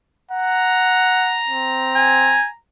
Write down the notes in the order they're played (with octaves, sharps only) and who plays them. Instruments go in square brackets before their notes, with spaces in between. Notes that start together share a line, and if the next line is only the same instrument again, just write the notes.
[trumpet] F#5 [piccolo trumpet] A#5
[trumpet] C4
[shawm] G#5